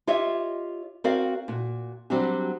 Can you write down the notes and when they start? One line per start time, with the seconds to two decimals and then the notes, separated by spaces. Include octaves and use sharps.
0.07 F4 G4 C#5 D#5 E5
1.04 C4 F#4 A#4 D5 F5
1.48 A#2 F#4
2.10 F#3 G3 C4 D4 F#4 G4